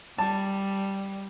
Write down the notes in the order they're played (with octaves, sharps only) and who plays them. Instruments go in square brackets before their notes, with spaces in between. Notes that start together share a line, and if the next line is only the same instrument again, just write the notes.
[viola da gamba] G3 [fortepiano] A5